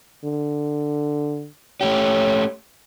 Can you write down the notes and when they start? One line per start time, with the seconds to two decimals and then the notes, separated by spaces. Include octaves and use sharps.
0.25 D3
1.81 A3 C#4 G4 C#5